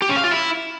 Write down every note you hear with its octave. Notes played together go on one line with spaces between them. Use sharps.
G4
C#4
F5
F4
E4